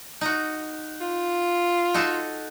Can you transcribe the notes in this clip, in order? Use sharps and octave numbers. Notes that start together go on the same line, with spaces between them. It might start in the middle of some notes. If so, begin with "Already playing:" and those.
D#4 F#4
F4
D#4 F#4 A4